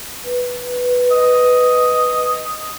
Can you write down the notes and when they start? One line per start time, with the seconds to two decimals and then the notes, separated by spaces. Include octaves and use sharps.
0.25 B4
1.11 D#5